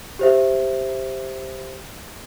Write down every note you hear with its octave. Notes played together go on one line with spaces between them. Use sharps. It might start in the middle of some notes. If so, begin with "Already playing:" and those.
G4 C5 E5